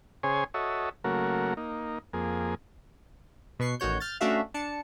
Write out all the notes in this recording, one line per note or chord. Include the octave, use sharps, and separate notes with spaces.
C#3 G#4 C5 C#5 G#5
F#4 A4 C#5 D#5 E5
C#3 F#3 A3 A#3 F#4 A#4
A#3 D#4
F2 A#3 G#4
B2 B4 C#6 C7
A1 D#3 F#4 C#5 G6
F6 G6 A6
A3 C#4 D4 F#4 E5 F5
D4 A5 C#7